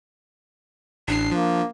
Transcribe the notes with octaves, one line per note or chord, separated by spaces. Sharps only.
A1 D4 C7
F3 A#3